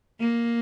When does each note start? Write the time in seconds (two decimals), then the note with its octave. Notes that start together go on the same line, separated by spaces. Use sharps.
0.20 A#3